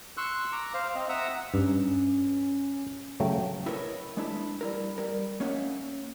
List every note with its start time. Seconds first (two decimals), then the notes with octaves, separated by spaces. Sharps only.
0.17 C6 C#6 E6 F#6
0.52 A#5 D6
0.74 C5 F5
0.95 C4 D#5
1.09 E5 F#5 A#5 D#6 E6
1.54 G2 C#4
3.20 C#3 F#3 A3 G5
3.66 E4 A#4 B4 C#5 D#5 E5
4.17 G#3 D4 E4 E5
4.61 G3 E4 A#4
4.98 G3 A#4
5.40 A#3 C#4 D#4 C#5 E5 F#5